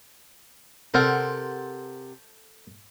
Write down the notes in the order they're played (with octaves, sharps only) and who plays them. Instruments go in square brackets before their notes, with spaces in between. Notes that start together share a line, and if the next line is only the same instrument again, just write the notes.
[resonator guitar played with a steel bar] C3 A#4 F#5 [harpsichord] A4 C5